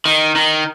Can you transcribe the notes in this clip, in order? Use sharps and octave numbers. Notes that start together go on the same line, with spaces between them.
D#3
D#3